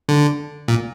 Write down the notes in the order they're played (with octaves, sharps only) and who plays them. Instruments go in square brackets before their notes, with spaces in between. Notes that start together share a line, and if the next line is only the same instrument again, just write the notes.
[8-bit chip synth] D3
A#2